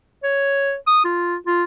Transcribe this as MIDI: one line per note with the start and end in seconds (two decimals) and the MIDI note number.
0.23 0.75 73
0.87 1.01 87
1.05 1.36 65
1.47 1.64 65